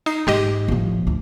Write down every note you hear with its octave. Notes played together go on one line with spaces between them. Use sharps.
D#4 C7
G#2 G#3 G4 D#5
A2 F3
D2